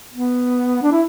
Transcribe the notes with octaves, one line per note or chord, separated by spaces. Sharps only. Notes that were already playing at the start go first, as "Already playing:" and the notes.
B3
D4
E4